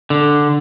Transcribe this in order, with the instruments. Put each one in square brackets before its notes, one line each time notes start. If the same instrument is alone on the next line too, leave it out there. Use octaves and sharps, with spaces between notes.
[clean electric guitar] D3